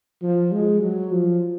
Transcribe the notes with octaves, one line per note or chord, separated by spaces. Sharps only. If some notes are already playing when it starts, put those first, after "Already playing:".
F3
G#3
F#3
F3